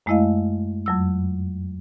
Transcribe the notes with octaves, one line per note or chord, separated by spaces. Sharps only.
F#2 G#3 A3 E4 D#5 F5
F2 F#3 E6